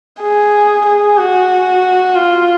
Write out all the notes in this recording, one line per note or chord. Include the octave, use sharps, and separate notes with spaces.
G#4
G#4
F#4
F4